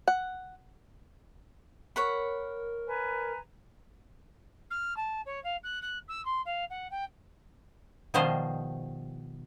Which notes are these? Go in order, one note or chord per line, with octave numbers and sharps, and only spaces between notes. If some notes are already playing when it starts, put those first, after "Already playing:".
F#5
A#4 C#5 F#5 B5
B4 G#5 A#5
F6
A5
C#5
F5
F#6
F#6
E6
C6
F5
F#5
G5
B2 D#3 F3 G3 G#4 C5